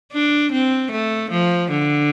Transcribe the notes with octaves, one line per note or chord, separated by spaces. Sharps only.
D4
C4
A3
F3
D3